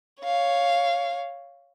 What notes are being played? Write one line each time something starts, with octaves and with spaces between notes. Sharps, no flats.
C#5 F5